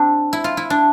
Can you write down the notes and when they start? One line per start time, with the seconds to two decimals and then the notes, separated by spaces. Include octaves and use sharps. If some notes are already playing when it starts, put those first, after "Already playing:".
Already playing: C4 D4
0.33 E4
0.44 F4
0.57 E4
0.70 D4